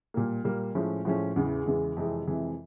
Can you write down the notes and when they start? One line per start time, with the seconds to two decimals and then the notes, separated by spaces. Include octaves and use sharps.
0.14 A#2 G3 A#3
0.45 A#2 G3 A#3
0.75 A2 F3 G#3 C#4
1.05 A2 F3 G#3 C#4
1.36 E2 C#3 E3 G#3
1.66 E2 C#3 E3 G#3
1.96 F2 C3 E3 G#3
2.27 F2 C3 E3 G#3